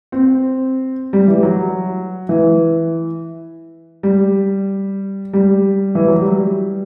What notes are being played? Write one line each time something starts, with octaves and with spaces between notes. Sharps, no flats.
C4
G3
E3
F#3
E3
G3
G3
E3
F#3
G3